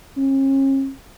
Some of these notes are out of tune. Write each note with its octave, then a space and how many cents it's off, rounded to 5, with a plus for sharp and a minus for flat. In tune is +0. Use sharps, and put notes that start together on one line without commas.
C#4 -40